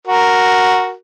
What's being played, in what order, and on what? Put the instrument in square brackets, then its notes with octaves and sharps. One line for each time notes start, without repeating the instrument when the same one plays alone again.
[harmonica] F#4 A#4